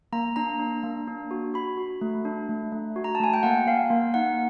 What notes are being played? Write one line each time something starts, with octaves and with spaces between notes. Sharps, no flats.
A#3 A#5
D4 A#5
D4
A#3
D4
F#4
F#4 B5
F#4
A3
D4
A3
A3
F#4
A#5
A5
A3 G#5
G5
A#3 F#5
A#3 F5
A#3
D#4 F#5